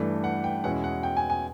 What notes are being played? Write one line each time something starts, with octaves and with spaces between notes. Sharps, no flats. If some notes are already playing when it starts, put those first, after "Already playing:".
Already playing: G2 E3 A3 D4
F#5
G5
E2 B2 G#3 C#4 E4 F#5
F#5
G5
G#5
G#5